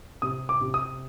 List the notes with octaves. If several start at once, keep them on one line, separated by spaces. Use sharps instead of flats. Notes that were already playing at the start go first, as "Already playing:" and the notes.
C3 D#6
D6
C3
D#6